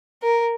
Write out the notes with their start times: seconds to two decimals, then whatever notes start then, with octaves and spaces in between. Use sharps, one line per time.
0.23 A#4